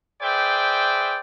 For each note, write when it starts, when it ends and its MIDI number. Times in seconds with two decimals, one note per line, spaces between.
0.21 1.21 68
0.21 1.21 71
0.21 1.21 72
0.21 1.21 74
0.21 1.21 76
0.21 1.21 79